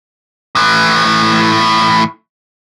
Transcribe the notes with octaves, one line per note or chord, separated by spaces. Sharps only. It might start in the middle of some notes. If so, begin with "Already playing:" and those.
A2 E3